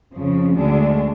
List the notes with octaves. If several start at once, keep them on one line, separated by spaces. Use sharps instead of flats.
F2 C#3 F3
D2 D3 G#3 D4